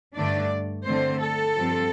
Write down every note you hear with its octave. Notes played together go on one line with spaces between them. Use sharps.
G2 D3 A3 D4 D5
D3 A3 C4 C5
A4
G2 F3 C4